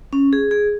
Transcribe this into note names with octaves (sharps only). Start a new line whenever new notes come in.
C#4
G#4
G#4